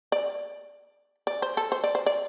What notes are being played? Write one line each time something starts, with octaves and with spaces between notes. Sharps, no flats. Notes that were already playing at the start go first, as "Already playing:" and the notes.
D5
D5
C5
A4
C5
D5
C5
D5